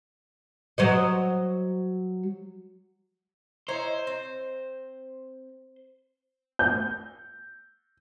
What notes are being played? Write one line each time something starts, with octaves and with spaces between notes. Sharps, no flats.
F#3 C5 D#5
D#4 E4 C5 C#5
C4
G6